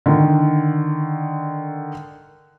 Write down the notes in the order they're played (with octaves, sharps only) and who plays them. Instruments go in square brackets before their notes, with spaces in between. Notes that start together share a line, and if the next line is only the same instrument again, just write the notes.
[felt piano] D3 D#3